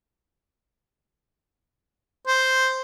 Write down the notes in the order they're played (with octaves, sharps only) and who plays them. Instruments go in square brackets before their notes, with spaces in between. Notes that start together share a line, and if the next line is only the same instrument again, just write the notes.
[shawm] C5